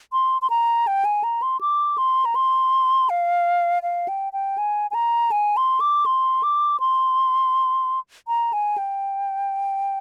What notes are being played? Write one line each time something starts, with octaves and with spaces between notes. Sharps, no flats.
C6
C6
A#5
G5
G#5
A#5
C6
D6
C6
A#5
C6
F5
F5
G5
G5
G#5
G#5
A#5
G#5
C6
D6
C6
D6
C6
A#5
G#5
G5